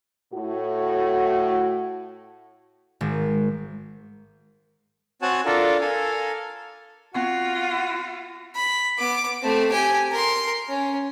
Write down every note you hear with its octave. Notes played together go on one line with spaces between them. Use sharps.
A2 F#4
G#1
C4 F#4 C#5 F#5 G#5 A5
D4 F4 A4 A#4
A4 A#4 F5 G#5
B3 C4 F4 F#4 F#5 C#6
B5
B3 D6
A3 C4
G4 G#5
A#4 C6
C#4